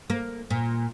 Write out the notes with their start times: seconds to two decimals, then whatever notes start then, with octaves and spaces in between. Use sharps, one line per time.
0.10 A#3
0.50 A#2